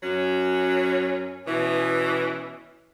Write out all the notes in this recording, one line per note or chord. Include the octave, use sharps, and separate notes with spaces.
F#2 F#3 C#4
B2 E3 C#4 E4